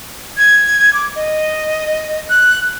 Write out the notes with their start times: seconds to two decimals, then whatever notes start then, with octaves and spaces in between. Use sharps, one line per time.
0.37 G#6
0.94 D6
1.16 D#5
2.30 F#6